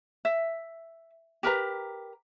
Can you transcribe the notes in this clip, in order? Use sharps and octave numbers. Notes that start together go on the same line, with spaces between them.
E5
G4 A#4 B4 A#5